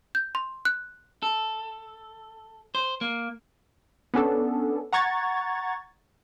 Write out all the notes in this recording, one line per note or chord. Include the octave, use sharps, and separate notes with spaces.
G6
C6
F#6
A4
C5
A#3
B3 C#4 D4 A4
F#5 A#5 C#6 G#6 A6